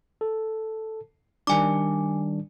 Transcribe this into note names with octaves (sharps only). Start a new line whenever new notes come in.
A4
D#3 G3 D4 G#5 D6